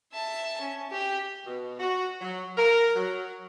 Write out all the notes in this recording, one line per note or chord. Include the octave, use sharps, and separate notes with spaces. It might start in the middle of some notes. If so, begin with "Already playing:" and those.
E5 A5
C#4
G4
B2
F#4
F#3
A#4
F#3